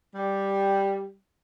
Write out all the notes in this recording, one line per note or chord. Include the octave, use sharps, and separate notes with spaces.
G3